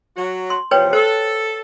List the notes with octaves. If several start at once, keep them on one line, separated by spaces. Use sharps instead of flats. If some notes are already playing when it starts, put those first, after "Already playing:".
F#3 F#4
C6
E2 C3 F3 B4 C#5 G5
A4 C5